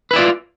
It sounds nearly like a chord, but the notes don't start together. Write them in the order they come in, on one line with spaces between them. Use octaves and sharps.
B4 E4 D5 F4